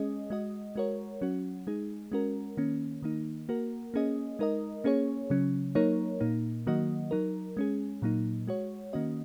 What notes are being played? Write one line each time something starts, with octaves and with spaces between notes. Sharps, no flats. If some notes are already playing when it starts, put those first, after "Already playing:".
Already playing: G#3 C#4 G#4 D#5
G#3 F#4 D#5
G#3 F#4 A#4 C#5
F#3 C#4 F#4
G#3 D#4 G#4
G#3 C#4 F#4 A#4
D#3 A#3 C#4
D#3 A#3 D#4
A#3 F#4 A#4
A#3 C#4 G#4 D#5
G#3 D#4 A#4 D#5
A#3 C#4 G#4 C#5
C#3 F#3 C#4
F#3 A#3 D#4 A#4 C#5
A#2 A#3 D#4
D#3 F#3 A#3 F#4 D#5
F#3 D#4 A#4
G#3 C#4 G#4
A#2 F#3 A#3 D#4
G#3 F#4 C#5
D#3 A#3 C#4 F#4 D#5